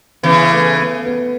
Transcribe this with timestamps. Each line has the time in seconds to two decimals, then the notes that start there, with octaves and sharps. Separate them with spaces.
0.23 C#3 E3 B3
0.51 A3
0.78 B3
1.06 B3